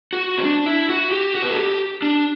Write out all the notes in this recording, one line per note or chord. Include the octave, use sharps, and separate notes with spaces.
F#4
C4
D4
E4
F#4
G4
F#4
B4
A4
G4
D4